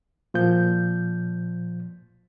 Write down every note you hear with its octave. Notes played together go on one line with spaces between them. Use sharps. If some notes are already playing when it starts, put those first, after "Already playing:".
A#2 F3 G6